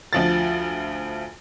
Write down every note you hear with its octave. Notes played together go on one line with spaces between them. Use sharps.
D2 F3 A6